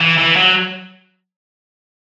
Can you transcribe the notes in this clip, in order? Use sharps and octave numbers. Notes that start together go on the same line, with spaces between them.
E3
E3
F#3